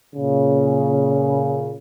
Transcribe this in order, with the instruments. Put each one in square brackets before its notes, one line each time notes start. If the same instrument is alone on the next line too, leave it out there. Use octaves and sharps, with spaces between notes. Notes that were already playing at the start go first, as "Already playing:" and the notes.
[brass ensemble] A#2 C#3